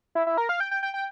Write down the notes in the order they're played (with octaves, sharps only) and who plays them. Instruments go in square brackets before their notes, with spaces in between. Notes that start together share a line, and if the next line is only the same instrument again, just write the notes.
[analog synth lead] E4
E4
A#4
F5
G5
G5
G5
G5